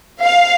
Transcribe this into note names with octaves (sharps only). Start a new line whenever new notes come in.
F5